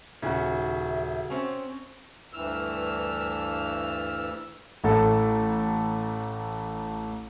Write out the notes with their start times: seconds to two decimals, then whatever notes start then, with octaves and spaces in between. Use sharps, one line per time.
0.22 D#1 C#3 F#4 E5
1.30 C4 C#4
2.33 D2 G2 E3 E6 F6
4.84 A1 A2 A4 A5